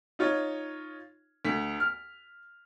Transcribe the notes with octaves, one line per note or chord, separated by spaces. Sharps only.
D#4 F4 C#5
D2 B6
F6